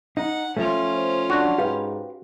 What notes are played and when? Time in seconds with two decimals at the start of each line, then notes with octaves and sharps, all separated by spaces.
0.17 D#4 F#5
0.57 F3 A3 C#4 F4
0.95 C5
1.30 D4 F#4
1.58 G#2 G4 B4 F5